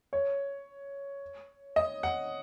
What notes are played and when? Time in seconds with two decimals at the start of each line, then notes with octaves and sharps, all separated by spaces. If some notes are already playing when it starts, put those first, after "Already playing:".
0.13 C#5
1.76 D#5
2.03 F#5